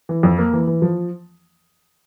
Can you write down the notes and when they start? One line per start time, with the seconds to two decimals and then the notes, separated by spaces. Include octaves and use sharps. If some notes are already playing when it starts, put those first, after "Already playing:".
0.09 E3
0.23 F2
0.38 A#3
0.53 E3
0.67 E3
0.82 F3